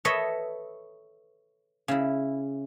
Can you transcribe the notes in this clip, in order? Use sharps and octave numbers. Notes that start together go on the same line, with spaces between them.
A4 B4 C#5 D#5 E5
C#3 E4